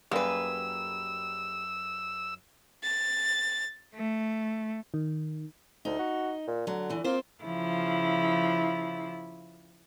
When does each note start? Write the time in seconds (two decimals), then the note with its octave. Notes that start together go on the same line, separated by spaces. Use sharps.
0.11 F#2 G3 A#3 G#4 B4 E6
2.84 A6
3.95 A3
4.94 D#3
5.85 D2 D#4
5.99 F#4
6.47 A#2
6.67 D3 F#3
6.89 E2 E3
7.04 A#3 C4 F4 C5
7.44 C#3 F3 E4